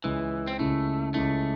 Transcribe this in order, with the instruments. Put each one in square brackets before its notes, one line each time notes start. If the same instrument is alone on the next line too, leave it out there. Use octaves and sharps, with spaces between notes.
[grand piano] C#2 C#3 G#3 C#4 E4 [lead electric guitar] E3
[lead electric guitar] C4
[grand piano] C#2 C#3 G#3 C#4 E4 [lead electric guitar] A3
[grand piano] C#2 C#3 G#3 C#4 E4 [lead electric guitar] A3